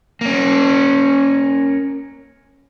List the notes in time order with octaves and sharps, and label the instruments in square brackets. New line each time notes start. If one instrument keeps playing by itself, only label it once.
[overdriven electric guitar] A#3 C#4